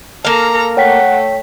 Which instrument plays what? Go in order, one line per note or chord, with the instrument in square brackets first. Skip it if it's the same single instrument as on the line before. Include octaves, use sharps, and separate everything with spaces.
[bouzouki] A#3 F5 [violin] A4 A#5
[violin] A3 [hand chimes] C#5 G5 B6 [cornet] F#5